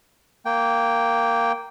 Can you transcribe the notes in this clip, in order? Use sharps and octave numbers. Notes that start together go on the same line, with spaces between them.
A#3 G5